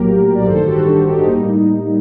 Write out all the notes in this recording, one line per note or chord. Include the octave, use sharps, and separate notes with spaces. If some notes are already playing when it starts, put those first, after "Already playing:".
Already playing: A#1 A2 F#3 A#3 G4 A#4
D5
A1 G2 D#3 A4 C5
G4
F#4 A4
D4 F#4
D#4 G4
A2 G3 A#3 D#4